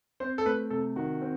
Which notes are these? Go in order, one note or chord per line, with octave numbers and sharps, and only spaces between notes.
C4 C5
A4
A3 B4
C3 A4
D#3 F#4
C4